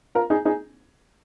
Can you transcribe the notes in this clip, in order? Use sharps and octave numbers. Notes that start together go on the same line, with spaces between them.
F4 A#4
D#4 G#4
D#4 G#4